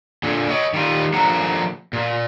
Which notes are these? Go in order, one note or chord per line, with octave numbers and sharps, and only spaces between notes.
A#2 D3
C#5 D#5
D#3 G3 F4
D3 F3 A#3 F#5 A#5
A#2